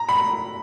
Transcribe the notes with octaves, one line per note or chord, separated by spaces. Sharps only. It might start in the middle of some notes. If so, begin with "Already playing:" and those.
Already playing: A#5
B5